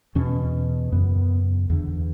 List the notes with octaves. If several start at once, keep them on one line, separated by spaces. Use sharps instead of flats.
E2 B2 C#4
F#2 C#3 B3
E2 D3